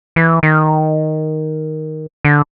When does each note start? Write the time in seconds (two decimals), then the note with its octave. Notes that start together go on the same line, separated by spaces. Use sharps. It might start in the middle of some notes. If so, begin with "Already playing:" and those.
0.16 E3
0.43 D#3
2.25 D3